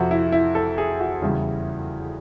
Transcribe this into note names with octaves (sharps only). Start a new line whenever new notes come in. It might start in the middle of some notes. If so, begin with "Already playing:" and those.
Already playing: F2 C3 F3 F#4
E4
E4
A4
G#4
F#4
E2 C#3 E3 G3